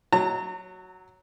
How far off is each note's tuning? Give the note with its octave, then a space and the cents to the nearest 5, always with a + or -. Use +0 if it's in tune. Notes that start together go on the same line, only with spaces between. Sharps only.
F#3 +0 A#5 -40